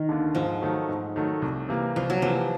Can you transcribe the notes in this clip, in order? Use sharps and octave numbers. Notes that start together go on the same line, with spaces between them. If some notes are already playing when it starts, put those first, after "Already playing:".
Already playing: D#3
D#2 D3
G#2 F3
D#3 F#3 A3
G#2
D#3 F#3 A3
C2
C3 E3 G3 A#3
C2 F3
F#3
C3 E3 F3 G3 A#3